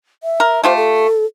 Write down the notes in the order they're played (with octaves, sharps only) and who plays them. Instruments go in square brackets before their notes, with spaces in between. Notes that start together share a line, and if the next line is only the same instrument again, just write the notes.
[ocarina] E5
[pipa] A#4
[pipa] A3 F4 G4 [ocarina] C5
[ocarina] A4